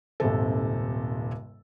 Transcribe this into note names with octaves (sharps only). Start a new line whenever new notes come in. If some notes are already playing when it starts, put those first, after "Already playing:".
D#1 G#1 C3 A4